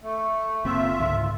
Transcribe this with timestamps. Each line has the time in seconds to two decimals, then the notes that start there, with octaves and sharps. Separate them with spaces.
0.02 A3
0.65 F#1 A#3 C4 F4 E5
0.99 C#2 G#2 D3